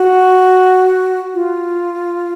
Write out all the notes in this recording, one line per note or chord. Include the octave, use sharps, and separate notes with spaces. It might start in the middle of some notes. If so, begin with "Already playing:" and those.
Already playing: F#4
F4